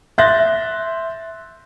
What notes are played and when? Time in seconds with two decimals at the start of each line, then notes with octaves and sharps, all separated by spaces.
0.18 E5 C6 F#6 G6 A6 A#6